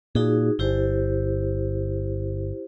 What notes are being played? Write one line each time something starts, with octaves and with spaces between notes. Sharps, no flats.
A#2 D#4 F#4 G#4
G1 E4 G4 C5